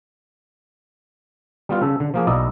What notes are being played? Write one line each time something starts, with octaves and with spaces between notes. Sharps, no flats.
G3 B3 F4
C#3 A4
D3
F3 A#3 G#4
B1 E4 D5 D#5 A#5